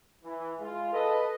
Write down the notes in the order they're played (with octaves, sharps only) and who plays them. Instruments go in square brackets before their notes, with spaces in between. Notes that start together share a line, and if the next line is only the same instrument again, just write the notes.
[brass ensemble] E3
G#3 F4
A4 B4 D#5